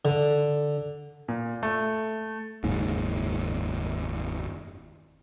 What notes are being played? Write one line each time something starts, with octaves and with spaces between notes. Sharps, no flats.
D3
A#2
A3
F#1 D#2 G#2